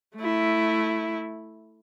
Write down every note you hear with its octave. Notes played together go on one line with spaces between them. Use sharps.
A3 E4